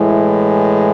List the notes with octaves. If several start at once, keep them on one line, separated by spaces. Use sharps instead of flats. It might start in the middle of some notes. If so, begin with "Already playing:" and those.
Already playing: A2 E3 G#3